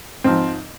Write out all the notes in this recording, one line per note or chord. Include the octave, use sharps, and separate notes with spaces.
G#2 F3 C4